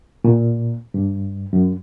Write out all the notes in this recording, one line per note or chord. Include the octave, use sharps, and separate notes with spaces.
A#2
G2
F#2